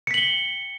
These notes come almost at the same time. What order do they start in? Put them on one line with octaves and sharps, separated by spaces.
C#7 B6 F#7 G7